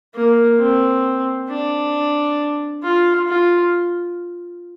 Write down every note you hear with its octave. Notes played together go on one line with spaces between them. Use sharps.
A#3
C4
D4
F4
F4